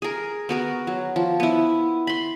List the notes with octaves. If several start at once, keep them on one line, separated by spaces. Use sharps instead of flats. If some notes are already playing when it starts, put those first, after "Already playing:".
G#4 A#4
B3 F#4 A#4
F#3
F3
B3 E4
B5 C6